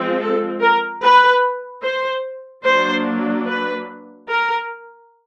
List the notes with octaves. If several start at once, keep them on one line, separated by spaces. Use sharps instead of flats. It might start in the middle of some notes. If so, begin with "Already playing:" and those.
Already playing: F3 G#3 C4
A4
A#4
B4
C5
F#3 A#3 D4 C5
B4
A#4